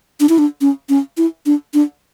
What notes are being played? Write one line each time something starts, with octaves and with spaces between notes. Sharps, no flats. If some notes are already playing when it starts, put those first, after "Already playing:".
D4
E4
D4
C#4
C#4
E4
D4
D4